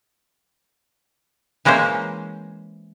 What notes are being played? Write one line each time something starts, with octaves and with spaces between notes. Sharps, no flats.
E3 G#3 A#3 C#4 C5